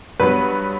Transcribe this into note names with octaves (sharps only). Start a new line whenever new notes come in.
G2 F#3 B3 B4